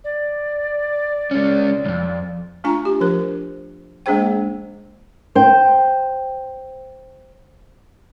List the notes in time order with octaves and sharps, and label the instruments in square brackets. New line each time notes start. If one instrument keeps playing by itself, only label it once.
[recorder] D5
[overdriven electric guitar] G#3 C#4
C2 F2
[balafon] A3 D4 F4 G#5 A#5
G4
F3 D4 A#4 C5
G#3 A#3 D4 G#4 C5 G5
[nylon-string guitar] C5 G5